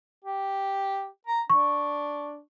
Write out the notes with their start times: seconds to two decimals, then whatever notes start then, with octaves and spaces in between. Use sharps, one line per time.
0.24 G4
1.27 A#5
1.50 D4 C#6